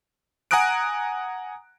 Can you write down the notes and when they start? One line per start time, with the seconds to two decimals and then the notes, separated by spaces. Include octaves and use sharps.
0.51 F#5 G#5 A#5 D#6 F#6 D7